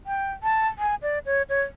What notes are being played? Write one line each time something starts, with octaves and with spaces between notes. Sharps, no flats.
G5
A5
G#5
D5
C#5
C#5